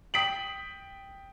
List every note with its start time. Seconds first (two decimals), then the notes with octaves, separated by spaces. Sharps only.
0.14 G5 D#6 B6 D7 F#7